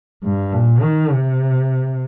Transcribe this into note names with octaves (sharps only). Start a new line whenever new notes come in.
G2
A#2
D#3
C3